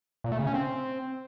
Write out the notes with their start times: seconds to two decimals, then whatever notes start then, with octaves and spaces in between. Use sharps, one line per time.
0.24 A#2
0.32 A3
0.39 C#3
0.47 C#4
0.54 C4